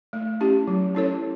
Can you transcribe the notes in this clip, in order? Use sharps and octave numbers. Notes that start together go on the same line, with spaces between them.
A3
C#4 E4 G4
F#3
C#4 E4 A4 C#5